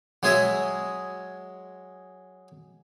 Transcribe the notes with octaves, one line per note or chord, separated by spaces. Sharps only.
F#3 G#3 G#4 C#5 D#5 E5